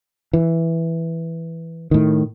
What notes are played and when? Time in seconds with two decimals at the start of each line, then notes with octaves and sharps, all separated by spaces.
0.33 E3
1.91 A2 D#3